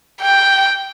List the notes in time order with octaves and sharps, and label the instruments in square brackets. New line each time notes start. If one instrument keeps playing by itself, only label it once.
[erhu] G5